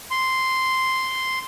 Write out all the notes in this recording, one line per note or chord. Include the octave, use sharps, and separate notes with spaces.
C6